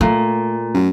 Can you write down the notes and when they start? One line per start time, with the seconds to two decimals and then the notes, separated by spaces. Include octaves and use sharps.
0.01 A#2 A3
0.74 F#2